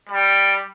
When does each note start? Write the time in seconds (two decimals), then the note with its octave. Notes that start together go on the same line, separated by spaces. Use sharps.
0.10 G3